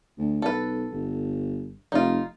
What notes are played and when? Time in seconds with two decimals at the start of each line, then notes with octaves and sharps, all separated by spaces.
0.18 D2
0.42 B1 A4 B4
0.92 G1
1.92 F1 D#4 F4